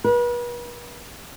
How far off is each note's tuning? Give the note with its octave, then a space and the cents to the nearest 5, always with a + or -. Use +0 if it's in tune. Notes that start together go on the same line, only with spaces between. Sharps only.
B4 -40